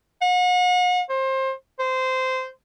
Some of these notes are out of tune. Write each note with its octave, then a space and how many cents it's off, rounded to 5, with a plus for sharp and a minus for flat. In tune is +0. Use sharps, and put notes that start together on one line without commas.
F#5 -40
C5 +25
C5 -15